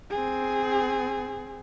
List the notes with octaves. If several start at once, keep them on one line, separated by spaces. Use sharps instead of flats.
C4 G#4